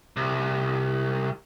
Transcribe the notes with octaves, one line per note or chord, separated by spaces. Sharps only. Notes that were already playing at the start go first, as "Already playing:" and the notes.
C2